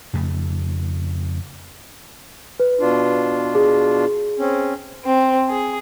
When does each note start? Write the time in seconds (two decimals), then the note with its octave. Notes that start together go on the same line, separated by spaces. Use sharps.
0.13 F2 C#3 A3
2.60 B4
2.80 B2 D4 F4
3.55 G#4
4.38 C4 C#4
5.05 C4
5.50 G#4